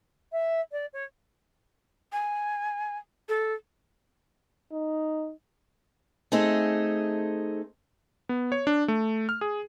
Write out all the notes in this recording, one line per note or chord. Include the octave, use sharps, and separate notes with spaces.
E5
D5
C#5
G#5
A4
D#4
A3 C4 D#4 G#4 A4
B3
C#5
D4
A3
F6
G#4